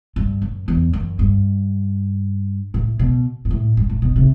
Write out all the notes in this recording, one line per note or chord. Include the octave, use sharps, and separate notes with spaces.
G2
F#2
E2
F#2
G2
A2
B2
G2
A2
G2
A2
B2
C3